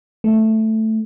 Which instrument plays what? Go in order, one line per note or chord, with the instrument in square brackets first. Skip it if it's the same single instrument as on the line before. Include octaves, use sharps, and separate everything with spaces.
[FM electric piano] A3